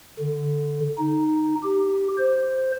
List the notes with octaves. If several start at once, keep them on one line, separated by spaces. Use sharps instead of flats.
D3
D#4
G4
C5